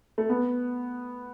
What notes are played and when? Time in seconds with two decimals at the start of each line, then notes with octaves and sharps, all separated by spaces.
0.18 A3
0.29 B3